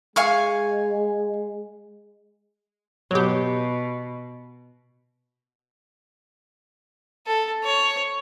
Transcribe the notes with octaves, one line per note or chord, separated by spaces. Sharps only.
G#3 F5 G#5 C#6
B2 F#3 G4
A4
C#5